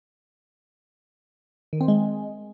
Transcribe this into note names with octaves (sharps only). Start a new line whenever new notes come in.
D#3
C4
G#3